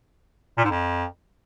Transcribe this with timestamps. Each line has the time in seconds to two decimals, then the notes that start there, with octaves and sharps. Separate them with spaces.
0.57 A#2
0.64 G#2
0.71 F2